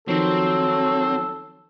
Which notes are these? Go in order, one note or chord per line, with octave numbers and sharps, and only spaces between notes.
D#3 F3 F#3 C4 A4